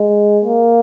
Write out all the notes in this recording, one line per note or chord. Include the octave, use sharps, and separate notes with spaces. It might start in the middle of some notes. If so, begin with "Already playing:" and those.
Already playing: G#3
A#3